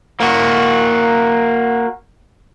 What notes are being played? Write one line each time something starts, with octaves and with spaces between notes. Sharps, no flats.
A#3 F#4